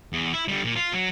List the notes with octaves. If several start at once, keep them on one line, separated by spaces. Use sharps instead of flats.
E2
E4
D3 G3
A#2
F4
F#3